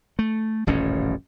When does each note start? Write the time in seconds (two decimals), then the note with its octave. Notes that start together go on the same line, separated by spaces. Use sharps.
0.19 A3
0.67 D#1 A1 F#2 C#4